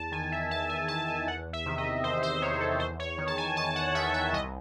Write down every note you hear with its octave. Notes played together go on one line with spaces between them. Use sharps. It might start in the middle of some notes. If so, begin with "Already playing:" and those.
Already playing: E2 A5
D#3 G#5
E5
E2 A5
G#5
D#3 A5
G#5
E2 F#5
E5
C3 D#3
D#5
E2 C5
C5
C3 D#3 C#5
A4
E2 C5
C#5
D#3
A5
G#5
E2 A5
F#5
D#3 E5
E5
C2 D#5